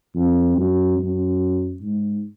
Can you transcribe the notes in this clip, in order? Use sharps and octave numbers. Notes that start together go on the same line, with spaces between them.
F2
F#2
F#2
G#2